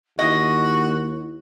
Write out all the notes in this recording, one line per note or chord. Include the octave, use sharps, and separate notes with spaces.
D#2 E4 F#4 D#5